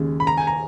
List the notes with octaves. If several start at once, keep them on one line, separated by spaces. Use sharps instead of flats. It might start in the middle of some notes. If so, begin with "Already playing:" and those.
Already playing: D#2 C#3 G#3
B5
A#5
G#5
A#5